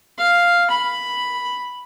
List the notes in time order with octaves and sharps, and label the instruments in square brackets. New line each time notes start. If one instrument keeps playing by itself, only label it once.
[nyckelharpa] F5
B5